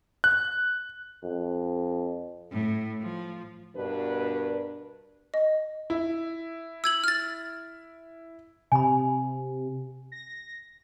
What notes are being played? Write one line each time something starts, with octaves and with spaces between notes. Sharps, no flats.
F#6
F2
A2
F3
G2 B2 D4 A#4 B4
D#5
E4
E6 G#6 F#7
F6 A6
C3 G#5 B5
A#6